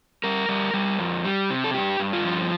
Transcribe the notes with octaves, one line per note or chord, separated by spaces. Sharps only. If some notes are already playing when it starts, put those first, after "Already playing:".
G3 A#4
G3
G3
F2
G3
C3
A4
G2 G4
G2
F4
F3